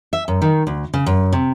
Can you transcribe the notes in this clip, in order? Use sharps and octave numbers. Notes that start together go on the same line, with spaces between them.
E5
F#2
D#3
D2
C#3
F#2
C3